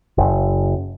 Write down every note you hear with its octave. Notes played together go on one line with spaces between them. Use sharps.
F#1